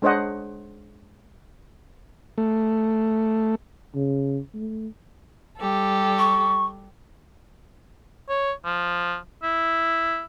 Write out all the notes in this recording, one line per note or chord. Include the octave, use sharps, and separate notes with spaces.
G#3 D4 C5 C#5 D#5 F#5
A3
C#3
A3
G3 G4 A4
C#6
C#5
F3
E4